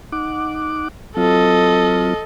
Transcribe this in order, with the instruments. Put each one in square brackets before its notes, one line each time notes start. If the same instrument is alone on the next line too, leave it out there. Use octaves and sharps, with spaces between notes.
[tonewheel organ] D#4 F#5 D6
[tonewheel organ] F#3 C4 F4 [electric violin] A4 D#5